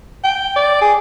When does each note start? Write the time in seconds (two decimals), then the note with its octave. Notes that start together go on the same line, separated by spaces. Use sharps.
0.24 G5
0.56 D5
0.81 G#4